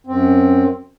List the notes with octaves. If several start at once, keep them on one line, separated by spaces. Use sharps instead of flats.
F#2 C4